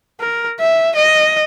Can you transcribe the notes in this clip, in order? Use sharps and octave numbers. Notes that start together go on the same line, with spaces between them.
A#4
E5
D#5